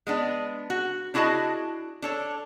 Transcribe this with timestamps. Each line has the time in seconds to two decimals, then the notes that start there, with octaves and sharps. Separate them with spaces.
0.07 G#3 B3 D4
0.70 F#4
1.14 D4 E4 F#4 G#4 D#5 A5
2.02 D4 A4 C#5